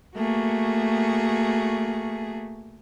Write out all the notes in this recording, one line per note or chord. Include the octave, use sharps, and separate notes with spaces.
A3 A#3 F#4 G#4